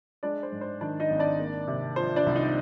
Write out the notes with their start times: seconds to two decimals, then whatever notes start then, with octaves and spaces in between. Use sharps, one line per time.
0.23 G#3 D4 D5
0.43 C5
0.52 G#2
0.61 C5
0.81 D#3 D4 D5
1.00 D#4 D#5
1.10 G#1
1.19 D4 D5
1.40 A#3
1.68 C3
1.96 F3 C5
2.16 D4 D5
2.26 C2
2.35 D#4 D#5